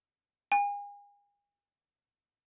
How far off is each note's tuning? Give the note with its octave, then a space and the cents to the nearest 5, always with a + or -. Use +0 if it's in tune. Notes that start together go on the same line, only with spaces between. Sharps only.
G#5 -35